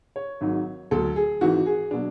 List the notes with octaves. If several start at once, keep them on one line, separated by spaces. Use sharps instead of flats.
C#5
G#1 G#2 F#3
D2 D3 F#3 A4
G#4
G#1 G#2 E3 F#4
G#4
B2 F#3 D4